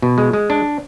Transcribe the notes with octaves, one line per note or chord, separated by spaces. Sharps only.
B2
G#3
G#3
D4